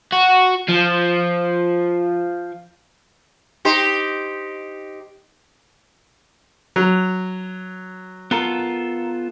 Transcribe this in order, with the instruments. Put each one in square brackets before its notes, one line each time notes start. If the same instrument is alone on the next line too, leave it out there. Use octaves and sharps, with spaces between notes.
[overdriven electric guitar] F#4
F3
[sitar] D#4 G4 C5
[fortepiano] F#3
[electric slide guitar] B3 F4 A4 [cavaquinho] A#4